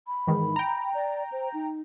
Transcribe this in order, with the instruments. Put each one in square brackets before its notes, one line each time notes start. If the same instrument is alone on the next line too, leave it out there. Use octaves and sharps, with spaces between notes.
[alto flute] B5
[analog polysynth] G#2 D#3 E3
G5 A#5
[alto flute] D5
C5
D#4